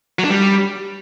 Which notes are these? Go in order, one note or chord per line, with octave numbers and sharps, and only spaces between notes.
F#3
D4
G3